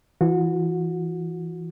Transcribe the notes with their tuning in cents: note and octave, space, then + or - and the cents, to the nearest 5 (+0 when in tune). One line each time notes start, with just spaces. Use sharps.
E3 +15 F#4 -25